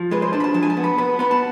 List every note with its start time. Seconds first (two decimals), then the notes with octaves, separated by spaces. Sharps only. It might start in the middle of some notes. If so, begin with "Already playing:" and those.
Already playing: F3
0.11 G#3 B4
0.22 C5
0.33 D4 A5
0.40 B5
0.44 A5
0.54 F3 A5
0.63 G#5
0.70 A5
0.77 B3
0.84 B5
0.98 B3 B5
1.19 B3 B5
1.31 A5